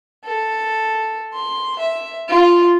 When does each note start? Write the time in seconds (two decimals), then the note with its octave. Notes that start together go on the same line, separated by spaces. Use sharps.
0.25 A4
1.33 C6
1.79 E5
2.28 F4